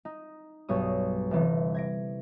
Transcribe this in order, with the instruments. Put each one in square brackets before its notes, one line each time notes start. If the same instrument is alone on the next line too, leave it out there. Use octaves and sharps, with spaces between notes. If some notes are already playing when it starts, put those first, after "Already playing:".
[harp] D#4
B1 G2 C#5 D#6
G1 C3 E3
G#6 A#6 D7